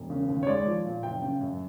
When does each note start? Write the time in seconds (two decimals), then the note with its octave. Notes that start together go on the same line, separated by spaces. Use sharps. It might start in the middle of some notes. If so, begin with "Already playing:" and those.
Already playing: E1
0.10 C#3
0.28 D#2
0.43 C#5
0.47 G#3 D5
0.66 F3
0.85 A#2
1.03 F#1 G5
1.22 C#3
1.41 F#2